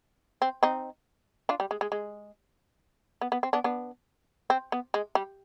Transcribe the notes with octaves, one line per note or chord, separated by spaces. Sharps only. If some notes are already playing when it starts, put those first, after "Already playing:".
C4
C4 D#4
D4 F4
G3
G#3
G#3
G#3
B3
B3
C4
B3 D4
B3 D4
C4
B3
G#3
G3